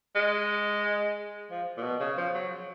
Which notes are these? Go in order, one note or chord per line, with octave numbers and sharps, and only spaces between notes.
G#3
F3
A#2
B2
C#3
F3
F#3